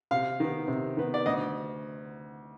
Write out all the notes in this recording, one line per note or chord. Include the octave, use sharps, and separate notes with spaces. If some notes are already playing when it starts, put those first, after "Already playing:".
C3 F5
D#3 B3
C3
D#3 B3
D5
D2 D#5